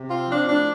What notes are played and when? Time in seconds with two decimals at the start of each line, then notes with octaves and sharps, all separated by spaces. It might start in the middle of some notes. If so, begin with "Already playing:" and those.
Already playing: C3
0.09 C4 F4
0.29 F3 D4
0.48 A2 D4